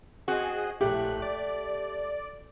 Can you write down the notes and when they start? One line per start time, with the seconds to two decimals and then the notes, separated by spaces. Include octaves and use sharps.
0.28 C4 F#4 G#4 D#5
0.81 A#1 A2 A3 G4 F#6
1.22 D5